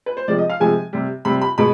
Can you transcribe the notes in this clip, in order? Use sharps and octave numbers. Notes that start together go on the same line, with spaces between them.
B4
C5
C3 F3 G#3 D5
D#5
F5
C3 F3 G#3 G#5
C3 G3
C3 G3 B5
B5
B2 G#3 B5